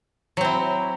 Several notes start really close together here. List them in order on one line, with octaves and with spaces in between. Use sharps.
F#3 C4 E4